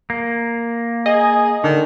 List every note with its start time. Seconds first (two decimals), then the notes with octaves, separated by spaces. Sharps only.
0.10 A#3
1.06 G#4 D#5
1.64 D3 D#3